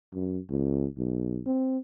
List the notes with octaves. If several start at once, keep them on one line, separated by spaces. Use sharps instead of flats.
F#2
C#2
B1
C4